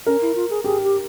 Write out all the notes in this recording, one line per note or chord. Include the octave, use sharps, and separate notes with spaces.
C#4 A#4
E4
F4
G#4
G4 G#4
G4